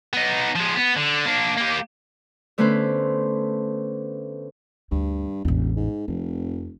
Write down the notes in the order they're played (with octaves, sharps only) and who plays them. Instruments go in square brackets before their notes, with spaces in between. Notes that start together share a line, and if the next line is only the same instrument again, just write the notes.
[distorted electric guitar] B3 D#4
F3 G#3
B3
D3
A#3 D4
A#3 G4
[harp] D3 A3 B3 C#4 B4 C5
[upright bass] D2 [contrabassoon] G2
[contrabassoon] E1 [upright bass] A1 E2
[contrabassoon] G#2
[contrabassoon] F1 [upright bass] F2